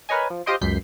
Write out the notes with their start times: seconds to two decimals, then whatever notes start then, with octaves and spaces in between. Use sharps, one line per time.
0.09 A#4 B4 C#5 D#5 G#5
0.30 F3
0.46 F4 G4 C5 D#5 G5 C6
0.61 C#2 F#2 G6 B6 C7